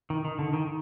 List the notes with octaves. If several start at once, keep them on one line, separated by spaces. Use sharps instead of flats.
D#3
D#3
D3
D#3